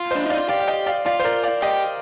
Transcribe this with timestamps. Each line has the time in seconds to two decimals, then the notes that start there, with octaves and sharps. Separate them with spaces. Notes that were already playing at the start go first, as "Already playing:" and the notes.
Already playing: F4
0.11 C5 D#5
0.15 D4
0.26 D#4 D5 F5
0.37 F4
0.49 G4 D5 F5
0.60 F5
0.68 D#5 G5
0.86 D5 F5
1.06 F4 D5 F5
1.20 C5
1.24 A#4 D5
1.44 D5 F5
1.62 G4 D#5 G5